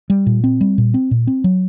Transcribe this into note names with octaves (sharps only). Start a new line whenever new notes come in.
G3
A#2
C4
G3
A#2
C4
A#2
C4
F#3